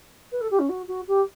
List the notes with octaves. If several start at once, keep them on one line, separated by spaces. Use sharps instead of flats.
B4
A4
G4
C#4
F#4
F#4
G4